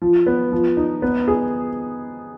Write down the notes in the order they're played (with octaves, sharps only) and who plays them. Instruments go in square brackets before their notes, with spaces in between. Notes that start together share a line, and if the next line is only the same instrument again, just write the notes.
[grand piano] F3
B3
F3
D#4
B3
G#4